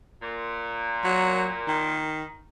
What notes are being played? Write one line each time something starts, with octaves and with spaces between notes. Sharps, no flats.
A#2
F#3
D#3